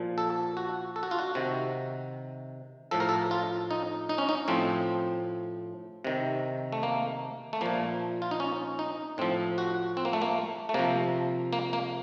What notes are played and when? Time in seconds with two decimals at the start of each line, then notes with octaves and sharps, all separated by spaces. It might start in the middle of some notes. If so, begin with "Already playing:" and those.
Already playing: A#2 F3
0.18 A4
0.57 F#4
0.96 A4
1.03 F#4
1.11 F4
1.19 F#4
1.35 C3 D#3
2.91 A2 F3 A4
3.00 A#4
3.09 A4
3.31 F4
3.71 D#4
4.09 D#4
4.18 C#4
4.29 D#4
4.48 A2 F3 C4
6.04 C3 D#3
6.72 A3
6.83 A#3
7.53 A3
7.61 A#2 F3 A#3
8.22 F4
8.31 D#4
8.40 C#4
8.79 D#4
9.18 A2 F3 C4
9.58 F#4
9.97 C4
10.05 A#3
10.13 A3
10.22 A#3
10.69 A3
10.74 C3 F3 A#3
11.53 A#3
11.73 A#3